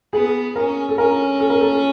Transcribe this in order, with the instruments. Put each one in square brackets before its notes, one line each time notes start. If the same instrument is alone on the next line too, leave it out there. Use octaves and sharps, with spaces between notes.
[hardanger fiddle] B3 [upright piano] G#4
[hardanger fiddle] C#4 [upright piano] A#4
[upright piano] A4
[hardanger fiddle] C#4 [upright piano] A#4
[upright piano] A4
A#4
A4